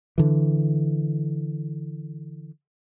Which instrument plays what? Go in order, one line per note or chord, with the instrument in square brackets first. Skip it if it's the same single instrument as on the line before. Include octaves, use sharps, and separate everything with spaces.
[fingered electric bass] D3 E3